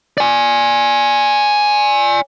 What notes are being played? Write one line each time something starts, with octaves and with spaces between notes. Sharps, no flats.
D5 G#5